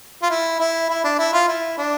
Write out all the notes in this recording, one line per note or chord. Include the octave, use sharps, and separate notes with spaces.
F4
E4
E4
E4
D4
E4
F4
E4
D4